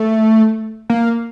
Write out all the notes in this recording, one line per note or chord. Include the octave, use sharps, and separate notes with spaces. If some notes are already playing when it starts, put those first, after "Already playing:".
Already playing: A3
A#3